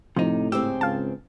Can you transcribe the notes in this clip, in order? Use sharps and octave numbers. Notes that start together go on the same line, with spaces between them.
A2 C3 F3 D#4
G#2 C#3 C4 G4 E6
C#2 F5 A5